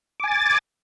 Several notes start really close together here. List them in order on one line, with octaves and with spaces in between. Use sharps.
D6 G#5 A6